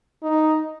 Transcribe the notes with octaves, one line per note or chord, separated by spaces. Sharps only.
D#4